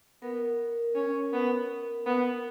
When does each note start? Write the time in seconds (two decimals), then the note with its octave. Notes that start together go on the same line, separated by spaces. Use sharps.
0.22 B3 A#4
0.95 C#4
1.33 B3
2.06 B3